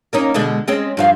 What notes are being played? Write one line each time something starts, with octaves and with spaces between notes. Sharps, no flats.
A#3 C#4 D#4
B2 D3 G#3
G#3 C4 C#4
G2 F3 F5